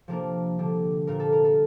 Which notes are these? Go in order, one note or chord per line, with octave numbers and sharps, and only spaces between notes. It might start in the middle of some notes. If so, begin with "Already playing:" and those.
C3 F3 A#3 D4 A#4
D3 G3 D4
A#2 G3 A#3 A#4
A4
A#4
A4